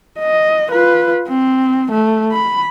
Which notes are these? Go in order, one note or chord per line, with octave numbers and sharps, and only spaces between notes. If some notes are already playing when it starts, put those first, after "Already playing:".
D#5
F4 B4
C4
A3
B5